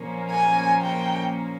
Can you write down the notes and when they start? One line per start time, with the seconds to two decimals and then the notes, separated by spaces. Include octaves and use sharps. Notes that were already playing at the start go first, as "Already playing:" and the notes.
Already playing: A#2 F3 A#3 C#4
0.31 G#5
0.82 G5